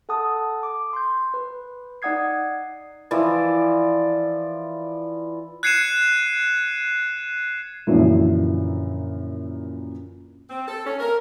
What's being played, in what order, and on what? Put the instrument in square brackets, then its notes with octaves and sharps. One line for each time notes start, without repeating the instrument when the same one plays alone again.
[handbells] A4 F#5 A5 D#6
D6
C6 G6
B4
D#4 D5 F#5 D#6 G#6 C7
[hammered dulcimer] E3 F3 D5
[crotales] F#6 G#6 C7 C#7 D#7 E7
[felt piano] F#2 A#2 D3 E3 F3 E4
[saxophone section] C4
A4
C#4
A#4